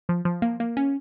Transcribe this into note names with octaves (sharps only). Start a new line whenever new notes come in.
F3
F3
A#3
A#3
C#4